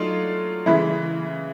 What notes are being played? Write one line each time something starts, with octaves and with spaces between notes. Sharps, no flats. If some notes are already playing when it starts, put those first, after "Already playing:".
Already playing: F#3 A3 D4 D#4 F4
C#3 E3 G#3 E4